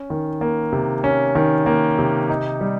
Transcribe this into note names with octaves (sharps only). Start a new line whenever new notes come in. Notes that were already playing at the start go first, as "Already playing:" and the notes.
Already playing: C#4
D#3
A#3
C3
C#4
D#3
A#3
C3
D#4
G3